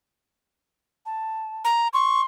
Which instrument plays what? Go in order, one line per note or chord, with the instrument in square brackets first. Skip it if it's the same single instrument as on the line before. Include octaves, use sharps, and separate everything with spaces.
[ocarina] A5
[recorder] A#5
[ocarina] C6 [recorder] C#6